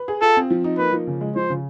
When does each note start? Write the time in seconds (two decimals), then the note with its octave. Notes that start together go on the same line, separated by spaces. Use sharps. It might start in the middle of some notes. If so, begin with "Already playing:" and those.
Already playing: B4
0.08 G#4
0.22 F4 A4
0.36 C4
0.50 F3
0.64 D#4
0.78 A#3 B4
0.93 F3
1.07 C#3
1.21 G#3
1.36 F3 C5
1.50 C#3